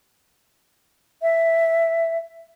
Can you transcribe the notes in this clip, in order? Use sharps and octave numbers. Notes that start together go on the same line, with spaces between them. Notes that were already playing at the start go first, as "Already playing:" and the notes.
E5